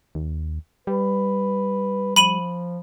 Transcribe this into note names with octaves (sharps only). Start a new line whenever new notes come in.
D#2
G3 B4
F3 B5 D#7 F#7